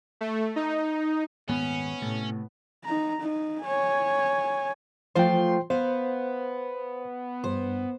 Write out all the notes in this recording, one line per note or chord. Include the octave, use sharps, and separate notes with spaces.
A3
D#4
D#1 G#2 D#3 B3 C#4
A2 C3 A3
D#4 A#5
D#4
C#5 G#5
F3 A3 F4 C5 G5 C6
B3 C5 F5
G2 C5